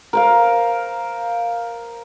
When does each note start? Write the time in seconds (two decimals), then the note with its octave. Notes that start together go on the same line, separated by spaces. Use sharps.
0.13 A#4 C5 F5